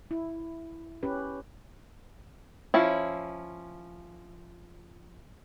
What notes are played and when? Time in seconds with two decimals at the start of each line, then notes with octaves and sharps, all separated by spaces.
0.11 E4
1.03 C#4 G4 B4
2.74 F3 C#4 E4